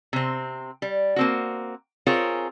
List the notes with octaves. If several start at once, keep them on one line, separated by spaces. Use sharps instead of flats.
C3 C4
G3
A#3 C4 F#4
C4 F4 G#4 A#4 C#5